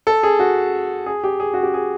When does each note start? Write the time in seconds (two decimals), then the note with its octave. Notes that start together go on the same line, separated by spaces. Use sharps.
0.07 A4
0.23 G#4
0.39 F#4
1.06 G#4
1.24 G4
1.40 G#4
1.54 F#4
1.63 G4
1.74 G#4